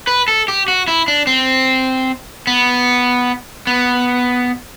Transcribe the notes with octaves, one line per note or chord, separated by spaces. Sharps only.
B4
A4
G4
F#4
E4
D4
C4
B3
B3